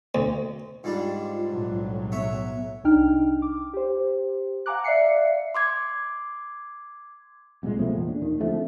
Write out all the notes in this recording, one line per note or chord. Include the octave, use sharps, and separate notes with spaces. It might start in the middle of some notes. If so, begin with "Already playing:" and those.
D2
G#2 G3 D4 F4
B1 A2 F#3
B3 C#5 E5
C2 D4 D#4 G5 F6
D6
G4 C5
F5 F#5 G#5 A#5 D6 F#6
D5 E5 F5 C7 C#7
C6 D6 G#6
C2 A#2 F#3 G#3
B2 F3 A3
E2 A#2
D4
D#2 D#3
D3 F3 A3 C4